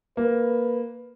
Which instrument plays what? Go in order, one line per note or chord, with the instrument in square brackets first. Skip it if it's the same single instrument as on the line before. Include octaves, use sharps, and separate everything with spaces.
[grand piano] A#3 [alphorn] B4